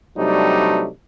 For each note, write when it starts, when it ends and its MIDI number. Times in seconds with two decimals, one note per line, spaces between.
0.17 0.87 48
0.17 0.87 54
0.17 0.87 55
0.17 0.87 57
0.17 0.87 62
0.17 0.87 63